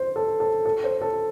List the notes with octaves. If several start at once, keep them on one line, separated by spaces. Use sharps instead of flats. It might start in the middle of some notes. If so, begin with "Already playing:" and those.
Already playing: C5
A4
A4
A4
C5
A4